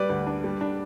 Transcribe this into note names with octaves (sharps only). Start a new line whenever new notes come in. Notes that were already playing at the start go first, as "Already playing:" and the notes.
Already playing: G3 B4 D5
D2
D4
G3
D4